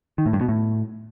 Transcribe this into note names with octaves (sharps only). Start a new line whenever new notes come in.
D#3
A2
G2
B2
A2